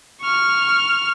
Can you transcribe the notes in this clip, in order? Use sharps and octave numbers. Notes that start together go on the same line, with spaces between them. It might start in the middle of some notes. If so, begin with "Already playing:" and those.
C#6 F6